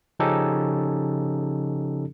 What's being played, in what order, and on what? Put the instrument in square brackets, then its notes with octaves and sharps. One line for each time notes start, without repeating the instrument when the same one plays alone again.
[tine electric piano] C#3 F3 C#4 D#4 G4 A4